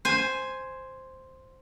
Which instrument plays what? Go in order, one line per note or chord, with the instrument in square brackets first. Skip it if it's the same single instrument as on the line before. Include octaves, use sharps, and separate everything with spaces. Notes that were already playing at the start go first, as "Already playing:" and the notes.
[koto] C5 G#5